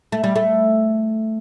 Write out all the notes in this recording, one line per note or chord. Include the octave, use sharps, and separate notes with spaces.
A3
G3
A3